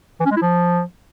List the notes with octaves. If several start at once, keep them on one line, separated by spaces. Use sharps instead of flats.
E3
C#4
G#3
E4
F3